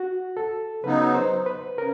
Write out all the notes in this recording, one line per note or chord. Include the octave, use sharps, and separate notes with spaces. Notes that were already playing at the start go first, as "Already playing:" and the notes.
Already playing: F#4
A4
C#3 F#3 B3 D#4 B4
C5
B4
C#3 A#4